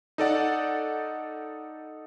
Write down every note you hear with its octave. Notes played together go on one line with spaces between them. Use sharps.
D#4 A4 D5 F#5